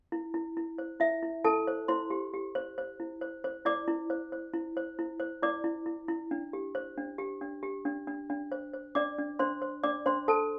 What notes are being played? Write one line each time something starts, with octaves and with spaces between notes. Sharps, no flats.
E4
E4
E4
C5
E4 E5
E4
E4 A4 A5
C5
E4 C5 C6
G4
G4
C5
C5
E4
C5
C5
E4 D5 D6
E4
C5
C5
E4
C5
E4
C5
E4 D5 D6
E4
E4
E4
D4
G4
C5
D4
G4
D4
G4
D4
D4
D4
C5
C5
D4 D5 D6
D4
D4 C5 C6
C5
D4 D5 D6
D4 C5 C6
A4 C5 A5